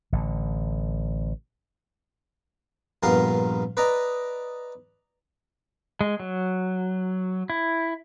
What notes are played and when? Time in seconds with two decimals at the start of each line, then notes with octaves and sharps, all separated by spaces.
0.13 A1 D3
3.03 A#1 G2 B3 F4 A#4 C6
3.77 B4 D5 D#5 A#5
6.01 G#3
6.20 F#3
7.50 E4